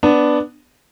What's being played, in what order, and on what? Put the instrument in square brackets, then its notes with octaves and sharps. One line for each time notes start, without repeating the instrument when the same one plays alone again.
[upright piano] B3 D4